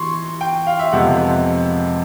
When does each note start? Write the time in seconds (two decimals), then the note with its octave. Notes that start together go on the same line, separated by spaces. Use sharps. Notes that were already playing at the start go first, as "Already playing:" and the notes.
Already playing: E3 C6 C#6
0.41 G5
0.67 F5
0.79 E5
0.93 F2 C3 F3 G#3 B3 F#5